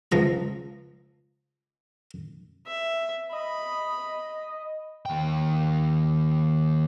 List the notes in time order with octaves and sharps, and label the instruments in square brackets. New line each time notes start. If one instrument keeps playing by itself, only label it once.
[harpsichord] C#2 F3 A#5
[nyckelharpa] E5
[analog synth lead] D#5 [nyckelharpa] B5
[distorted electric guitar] D#2 G5